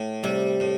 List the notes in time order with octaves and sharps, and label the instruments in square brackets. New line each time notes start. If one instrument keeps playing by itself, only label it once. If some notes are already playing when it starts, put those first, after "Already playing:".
Already playing: [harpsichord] A2
[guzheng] C3 [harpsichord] G3
[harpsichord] A2